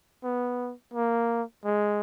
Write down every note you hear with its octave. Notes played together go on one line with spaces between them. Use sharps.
B3
A#3
G#3